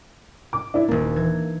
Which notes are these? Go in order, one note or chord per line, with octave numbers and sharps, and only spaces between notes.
D6
D4 E4
D#1 A#3 D4
E3 G#6